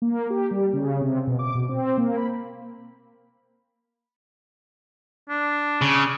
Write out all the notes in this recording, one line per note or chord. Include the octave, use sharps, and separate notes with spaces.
A#3
G4
G3
C#3
C3
B2
D6
B2
C4
A#3
B5
D4
C#3